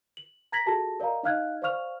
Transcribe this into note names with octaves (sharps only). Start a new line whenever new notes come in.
F#7
A#5 G#6 A#6 B6 F#7
F4 F#4 G#4 A4 A5 A#6
A#4 D5 D#5 F5 A#5
D#4 D#5 F5 F6 F#6 G#6
C5 D5 F5 C#6 F6 F7